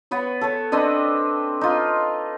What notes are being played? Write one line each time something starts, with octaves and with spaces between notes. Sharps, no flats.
B3 B4 C#5
A4 C#5
C4 D4 B4 D#5
D#4 F4 B4